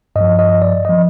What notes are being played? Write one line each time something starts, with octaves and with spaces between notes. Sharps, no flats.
G2 F3 D#5
D#5
D5
F3 D#5